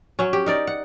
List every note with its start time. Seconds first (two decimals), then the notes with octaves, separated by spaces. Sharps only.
0.19 F#3 C#4
0.33 G4
0.46 D#4 A#4 D5
0.67 F#5